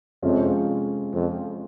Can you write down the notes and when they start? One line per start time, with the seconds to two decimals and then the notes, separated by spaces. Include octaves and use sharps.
0.22 F2 C3 F3 G#3 C#4 F4
1.13 F2